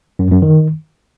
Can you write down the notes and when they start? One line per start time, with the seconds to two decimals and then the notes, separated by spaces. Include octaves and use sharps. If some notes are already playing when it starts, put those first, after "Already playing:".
0.19 F#2
0.31 F#2
0.42 D#3